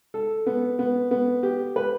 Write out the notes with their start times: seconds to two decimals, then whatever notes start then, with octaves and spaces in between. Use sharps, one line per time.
0.14 A4
0.46 B3
0.79 B3
1.11 B3
1.43 G4
1.76 B4